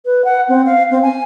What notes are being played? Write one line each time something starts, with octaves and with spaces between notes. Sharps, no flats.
B4
F#5
C4
F5
C4
G#5